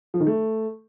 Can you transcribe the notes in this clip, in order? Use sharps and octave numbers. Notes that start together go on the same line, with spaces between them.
F3
D#3
A3